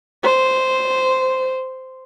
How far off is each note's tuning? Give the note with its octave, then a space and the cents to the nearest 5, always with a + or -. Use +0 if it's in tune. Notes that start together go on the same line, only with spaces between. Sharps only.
C5 -10